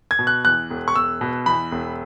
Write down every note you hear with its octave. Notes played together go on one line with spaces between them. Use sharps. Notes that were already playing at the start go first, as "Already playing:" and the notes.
G#6
B2
F#6
E2 F#6
E1
C#6
E1 E6
B2
E2 B5
E1